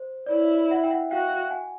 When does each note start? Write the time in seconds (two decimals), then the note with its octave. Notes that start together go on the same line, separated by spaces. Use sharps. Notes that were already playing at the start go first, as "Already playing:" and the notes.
Already playing: C5
0.26 D5
0.31 E4 C#5
0.71 E5 F#5
0.83 G5
0.91 E5 F#5
1.11 F#4 F5 G5
1.51 F#5 G#5